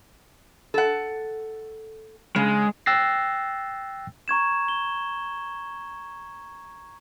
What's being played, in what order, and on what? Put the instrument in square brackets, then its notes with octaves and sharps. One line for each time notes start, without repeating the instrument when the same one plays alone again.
[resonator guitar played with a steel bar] A4 F#5
[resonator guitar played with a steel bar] C#3 [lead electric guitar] G#3
[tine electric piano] G5 E6 F#6 A6 A#6 C7
[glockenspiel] A#5 C#6 G#6 E7
G7